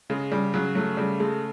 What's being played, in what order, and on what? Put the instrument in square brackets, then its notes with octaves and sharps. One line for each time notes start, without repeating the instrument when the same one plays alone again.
[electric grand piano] C#3 [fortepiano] G#3
[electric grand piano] C#3 [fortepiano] G3
[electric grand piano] C#3 [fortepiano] F#3
[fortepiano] F#3 [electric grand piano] A3
[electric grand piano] C#3 [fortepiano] G3
[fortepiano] G#3 [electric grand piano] A3